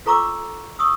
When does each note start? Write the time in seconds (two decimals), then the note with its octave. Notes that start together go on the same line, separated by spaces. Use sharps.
0.06 F4 A4 A#5 C#6 D6 E6
0.79 C#6 D#6 E6